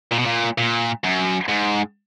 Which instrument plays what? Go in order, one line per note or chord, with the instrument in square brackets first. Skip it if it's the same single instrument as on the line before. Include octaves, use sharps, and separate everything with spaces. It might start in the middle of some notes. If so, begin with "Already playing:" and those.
[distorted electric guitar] A#2
B2
A#2
A#2
F#2
G#2